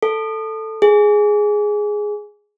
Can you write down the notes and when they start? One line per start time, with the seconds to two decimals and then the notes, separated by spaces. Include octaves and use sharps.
0.03 A4
0.82 G#4